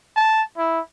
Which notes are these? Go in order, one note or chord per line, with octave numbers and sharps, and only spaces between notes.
A5
E4